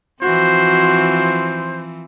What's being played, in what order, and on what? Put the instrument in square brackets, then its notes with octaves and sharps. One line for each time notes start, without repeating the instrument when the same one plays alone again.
[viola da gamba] E3 F3 C4 [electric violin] F#4 [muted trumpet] C5